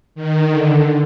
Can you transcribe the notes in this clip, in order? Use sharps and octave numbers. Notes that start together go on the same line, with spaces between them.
D#3
D3